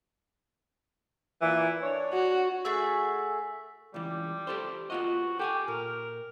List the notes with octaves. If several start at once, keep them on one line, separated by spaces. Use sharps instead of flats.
A#2 E3
D4 C#5
F#4
A3 F#4 G#4 E5
C#2 E3 G3
G4 A4 C5
B3 F4 F#4 D#5
G4 A4 G5 G#5
A#2 A#4